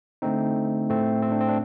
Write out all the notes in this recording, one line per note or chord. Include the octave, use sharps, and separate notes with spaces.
D3 A3 C4 D#4
A2 A3 C4
C4
D4
C4
D4